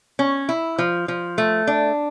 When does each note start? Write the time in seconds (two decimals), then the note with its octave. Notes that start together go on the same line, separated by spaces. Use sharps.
0.19 C#4
0.49 E4
0.79 F3
1.08 F3
1.38 A3
1.67 D4